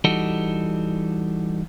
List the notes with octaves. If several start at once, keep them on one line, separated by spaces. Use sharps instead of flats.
E3 G3 D#4 F#4 A4